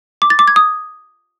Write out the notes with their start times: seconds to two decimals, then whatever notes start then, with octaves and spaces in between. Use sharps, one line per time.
0.22 D6
0.30 A6
0.39 D6
0.48 G#6
0.56 D#6